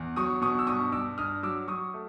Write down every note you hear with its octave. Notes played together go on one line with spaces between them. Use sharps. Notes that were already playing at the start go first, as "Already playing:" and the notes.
Already playing: E2
F#3 C#6 D#6
B2 C#6 D#6
E6
G2 C#6 D#6
G2 D6 E6
G2 D#6 F6
F#3 D6 E6
F#3 C#6 D#6
A3